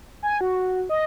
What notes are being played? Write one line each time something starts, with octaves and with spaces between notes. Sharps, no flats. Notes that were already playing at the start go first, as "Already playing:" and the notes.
G#5
F#4
D#5